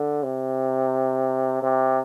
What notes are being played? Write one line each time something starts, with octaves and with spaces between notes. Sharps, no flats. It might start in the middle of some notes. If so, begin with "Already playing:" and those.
Already playing: D3
C3
C3